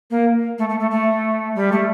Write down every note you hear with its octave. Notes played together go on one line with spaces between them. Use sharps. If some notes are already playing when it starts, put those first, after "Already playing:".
A#3
A3
A3
A3
A3
G3
A3